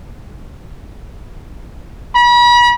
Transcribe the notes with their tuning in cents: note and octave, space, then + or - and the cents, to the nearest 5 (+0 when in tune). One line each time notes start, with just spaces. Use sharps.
B5 -40